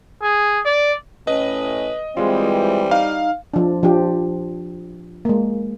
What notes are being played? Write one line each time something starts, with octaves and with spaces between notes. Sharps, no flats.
G#4
D5
A2 C#4 B4 D#5
E3 G3 G#3 C4 F4
D#4 F5
F3 D4
F3 D4 G4
G#3 A#3